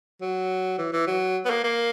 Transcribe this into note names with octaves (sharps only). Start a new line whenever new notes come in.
F#3
E3
E3
F#3
B3
A#3
A#3